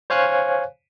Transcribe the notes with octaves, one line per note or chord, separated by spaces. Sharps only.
C5 C#5 F5 G#5 F#6